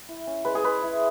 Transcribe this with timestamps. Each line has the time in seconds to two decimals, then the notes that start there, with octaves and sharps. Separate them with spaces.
0.09 E4
0.27 C#4
0.45 G#3 B4
0.55 G#4
0.64 G#3 B4
0.82 E4